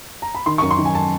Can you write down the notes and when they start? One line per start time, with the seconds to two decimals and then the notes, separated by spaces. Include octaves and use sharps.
0.22 A#5
0.35 B5
0.46 D#3 C6
0.58 C#6
0.62 F#2
0.71 C6
0.79 D#3
0.85 G#5
0.95 A5